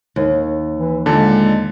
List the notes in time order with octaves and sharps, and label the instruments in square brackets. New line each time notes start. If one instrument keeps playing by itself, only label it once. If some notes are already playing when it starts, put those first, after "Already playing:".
[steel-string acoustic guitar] D#2
[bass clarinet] E3
[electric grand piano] A#2 D3 A5 [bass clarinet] G#3